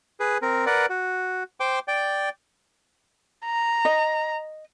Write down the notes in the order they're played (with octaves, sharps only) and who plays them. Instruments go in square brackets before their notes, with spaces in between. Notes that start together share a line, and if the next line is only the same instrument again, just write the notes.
[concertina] G#4 B4
C4 A#4
A#4 B4 D5 F#5
F#4
C5 G5 D6
D5 G5
[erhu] A#5
[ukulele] D#5